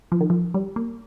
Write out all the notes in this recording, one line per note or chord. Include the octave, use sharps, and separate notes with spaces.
F3
D#3
F3
G3
A#3